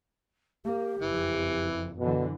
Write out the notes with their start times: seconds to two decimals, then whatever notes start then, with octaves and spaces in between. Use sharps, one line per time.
0.65 A#3 G4
1.02 F#1 F2 E3
1.99 F#2 B2 D3 E3